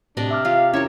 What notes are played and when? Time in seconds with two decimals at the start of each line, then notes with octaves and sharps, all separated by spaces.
0.17 A2 C3 D4 D5 D#5
0.31 E5 D6 F6
0.45 F4 G4 F5
0.74 C#4 E4 A#4 C#5 E5